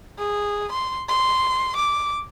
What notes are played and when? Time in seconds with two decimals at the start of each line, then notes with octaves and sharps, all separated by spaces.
0.18 G#4
0.72 C6
1.09 C6
1.76 D6